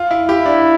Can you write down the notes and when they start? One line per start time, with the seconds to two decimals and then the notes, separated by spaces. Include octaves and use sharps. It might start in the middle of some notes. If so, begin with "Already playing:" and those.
Already playing: F4
0.11 E4
0.29 E4 G4
0.46 D4